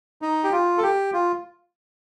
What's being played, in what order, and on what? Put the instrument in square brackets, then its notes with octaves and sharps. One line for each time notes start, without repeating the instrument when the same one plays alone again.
[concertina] D#4
G4
F4
A4
G4
F4